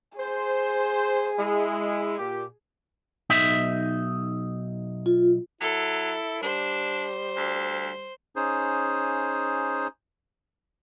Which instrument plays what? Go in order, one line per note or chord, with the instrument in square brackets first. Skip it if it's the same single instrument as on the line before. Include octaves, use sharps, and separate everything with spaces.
[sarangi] G#4 [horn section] C5
[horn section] G#3 E4
A#2 G4
[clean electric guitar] B1 D#4 E5
[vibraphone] F4
[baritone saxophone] F#3 [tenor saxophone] E4 [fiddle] A4
[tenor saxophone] G3 [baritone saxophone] D4 [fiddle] C5
[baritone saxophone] D2
[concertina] C#4 D#4 G#4 C5